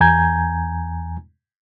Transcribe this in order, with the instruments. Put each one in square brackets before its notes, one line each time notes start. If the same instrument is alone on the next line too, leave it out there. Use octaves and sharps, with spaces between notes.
[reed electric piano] E2 G#5 A#5 G6 G#6